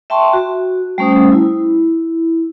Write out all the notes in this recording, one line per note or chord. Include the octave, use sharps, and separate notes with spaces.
E5 G5 A5 C6 C#6
F#4
G3 A3 C#4 C5 D#6
E4